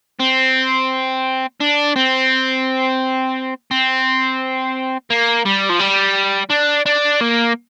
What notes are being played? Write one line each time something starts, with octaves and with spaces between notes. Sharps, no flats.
C4
D4
C4
C4
A#3
G3
F3
G3
D4
D4
A#3